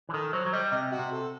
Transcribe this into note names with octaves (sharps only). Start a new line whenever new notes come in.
E3
D#3 A4
F#3 C5
F#3
G3 D#5
C3 D#5
F#4
C3
A4